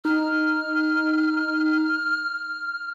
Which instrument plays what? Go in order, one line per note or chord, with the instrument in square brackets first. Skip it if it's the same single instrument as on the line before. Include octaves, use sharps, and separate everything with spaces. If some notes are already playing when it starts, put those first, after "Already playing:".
[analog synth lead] D#4 [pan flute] F6